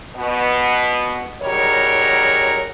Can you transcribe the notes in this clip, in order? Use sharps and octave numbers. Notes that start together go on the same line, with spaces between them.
B2 B3
F#3 G3 D#4 G#4 A#4 C#5